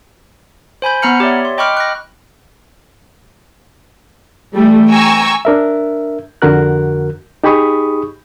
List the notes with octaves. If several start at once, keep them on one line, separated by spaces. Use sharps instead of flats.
C5 G#5 B5 G6
B3 F#5 A#5 B5 F6 C#7
G4 C#5 D5 E5
C6
D#5 G5 B5 C#6 D6 F6
F#6 A#6
E3 G3 A3
G5 G#5 A#5 C#6 E6
D4 A#4 E5
F2 D3 F#4 A#4 F#6
D#4 G4 G#4 B5 C#6 D#6